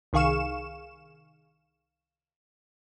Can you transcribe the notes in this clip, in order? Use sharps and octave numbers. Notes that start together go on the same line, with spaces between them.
C2 D#3 G#4 F5 C#6 E7